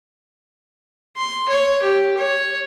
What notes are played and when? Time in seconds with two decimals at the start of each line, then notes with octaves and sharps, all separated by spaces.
1.16 C6
1.49 C#5
1.82 G4
2.17 C#5